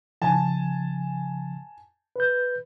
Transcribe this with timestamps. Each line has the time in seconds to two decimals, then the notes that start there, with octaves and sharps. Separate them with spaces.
0.22 C#3 F3 G#5 A5
2.16 B4 G6